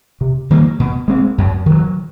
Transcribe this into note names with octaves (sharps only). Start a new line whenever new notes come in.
C3
D#3 G3 A#3
B2
G#3 C4
F#2
D#3 F#3